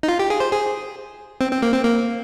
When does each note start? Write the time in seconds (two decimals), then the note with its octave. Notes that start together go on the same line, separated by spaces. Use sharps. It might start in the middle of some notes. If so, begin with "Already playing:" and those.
0.03 D#4
0.08 F4
0.19 G4
0.30 G#4
0.40 C5
0.52 G#4
1.41 C4
1.52 C4
1.62 A#3
1.73 C4
1.84 A#3